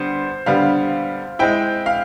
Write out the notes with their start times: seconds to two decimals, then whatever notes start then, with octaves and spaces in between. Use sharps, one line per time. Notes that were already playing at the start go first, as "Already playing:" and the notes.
Already playing: D3 G3 B3 C5
0.46 D3 G3 B3 F5
1.39 G#3 C4 E4 G5
1.86 F5